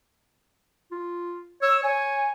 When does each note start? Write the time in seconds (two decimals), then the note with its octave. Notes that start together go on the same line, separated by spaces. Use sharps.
0.91 F4
1.62 C#5 E6
1.83 C#5 G#5